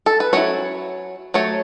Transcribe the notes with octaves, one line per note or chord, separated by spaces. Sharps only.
A4
B4
F#3 C#4 E4 C#5
F#3 A3 C#5